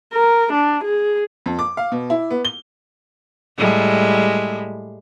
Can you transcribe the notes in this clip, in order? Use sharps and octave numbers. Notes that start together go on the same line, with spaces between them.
A#4
D4
G#4
F2
D6
F5
B2
E4
B3
G7
A2 G3 G#3